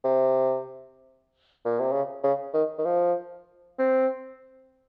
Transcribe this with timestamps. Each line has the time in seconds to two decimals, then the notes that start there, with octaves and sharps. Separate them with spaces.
0.04 C3
1.65 A#2
1.79 C3
1.92 C#3
2.24 C#3
2.54 D#3
2.78 D#3
2.85 F3
3.79 C4